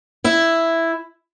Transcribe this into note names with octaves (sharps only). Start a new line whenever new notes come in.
E4 E5